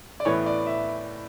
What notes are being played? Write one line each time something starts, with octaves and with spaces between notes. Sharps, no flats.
D5
A2 E3 B3 C#5
D5
E5